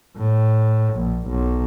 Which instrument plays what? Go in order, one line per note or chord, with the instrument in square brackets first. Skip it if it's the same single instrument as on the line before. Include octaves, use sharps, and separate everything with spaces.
[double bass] A2
A#1
B1